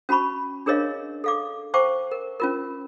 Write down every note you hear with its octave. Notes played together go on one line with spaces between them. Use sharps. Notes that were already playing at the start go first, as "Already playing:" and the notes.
C#4 F#4 A5 B5 C#6
D4 G#4 A#4 C#5 D#5 F5
A4 F5 D6
C5 F5 G5 A5 C#6 D6
A#4
C#4 F4 A#4